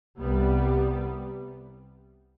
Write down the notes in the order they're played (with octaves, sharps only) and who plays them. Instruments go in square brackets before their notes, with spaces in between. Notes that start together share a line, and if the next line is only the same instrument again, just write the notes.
[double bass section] C2 C3 G3 B3